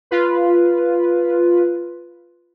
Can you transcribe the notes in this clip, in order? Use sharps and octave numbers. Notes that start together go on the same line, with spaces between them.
F4 B4